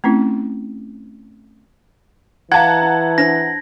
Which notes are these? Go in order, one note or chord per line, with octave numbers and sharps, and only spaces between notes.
A3 C4 C#4 E4
E3 E4 G#4 F5 F#5 A5 A#5 G#6
E4
D4 C5 A#6